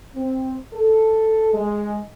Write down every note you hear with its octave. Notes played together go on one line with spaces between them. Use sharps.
C4
A4
G#3